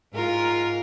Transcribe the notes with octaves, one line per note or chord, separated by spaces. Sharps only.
G#2 F4 A#4